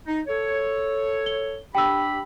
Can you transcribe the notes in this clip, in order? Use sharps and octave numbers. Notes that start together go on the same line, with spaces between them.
D#4
A4 C#5
G7
D4 G4 G5 B5 E6